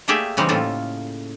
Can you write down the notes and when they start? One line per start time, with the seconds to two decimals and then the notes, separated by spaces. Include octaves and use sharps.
0.08 A3 A#3 G4 G#4 D5 E5
0.37 C#3 E3 G3 C4 D#4
0.49 A2 C#3 A#3 F4 A4